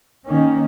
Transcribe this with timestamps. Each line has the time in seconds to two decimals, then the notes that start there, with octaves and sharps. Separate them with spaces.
0.28 D#3 A#3 C#4